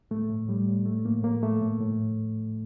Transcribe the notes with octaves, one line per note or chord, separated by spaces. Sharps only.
A2 A3
A2
A2 G3
A2
A2 A3
A2 A#3
A2 A#3
A2 A3
A2
A2